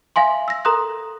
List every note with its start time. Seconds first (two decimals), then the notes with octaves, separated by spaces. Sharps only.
0.16 E5 F5 G#5 C6
0.48 E6 A#6
0.65 A4 A#4 A#5 C6 D#6 F#6